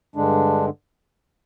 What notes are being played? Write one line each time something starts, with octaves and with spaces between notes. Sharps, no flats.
G2 D3 G#3 D4